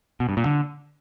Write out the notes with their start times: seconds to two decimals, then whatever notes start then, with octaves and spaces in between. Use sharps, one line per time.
0.20 B2
0.29 G2
0.37 A#2
0.46 D3